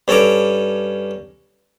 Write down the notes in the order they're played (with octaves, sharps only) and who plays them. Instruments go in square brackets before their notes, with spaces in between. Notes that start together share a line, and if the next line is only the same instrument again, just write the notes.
[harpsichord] G2 C#4 A4 A#5 D6